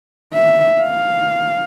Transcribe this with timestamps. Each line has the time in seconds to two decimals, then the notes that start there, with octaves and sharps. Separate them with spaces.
0.33 E5
0.81 F5